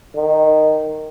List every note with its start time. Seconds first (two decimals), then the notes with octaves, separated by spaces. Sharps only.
0.15 D#3